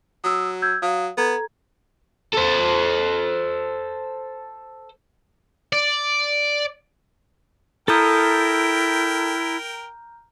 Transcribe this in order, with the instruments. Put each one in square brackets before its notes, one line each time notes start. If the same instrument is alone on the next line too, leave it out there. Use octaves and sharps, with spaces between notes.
[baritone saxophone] F#3 [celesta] D#6 E6
[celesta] E6 G6 G#6
[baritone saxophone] F#3 [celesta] F5 D#6
[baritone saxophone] B3 [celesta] A4 A#5 G#6
[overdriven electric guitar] A4 C5
[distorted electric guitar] D5
[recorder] E4 [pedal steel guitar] A4 D#6 [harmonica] A#4 G5 [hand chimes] A#5 F6 G6